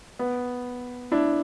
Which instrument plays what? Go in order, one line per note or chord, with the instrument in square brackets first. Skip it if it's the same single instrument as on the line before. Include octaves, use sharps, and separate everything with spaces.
[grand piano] B3
D4 E4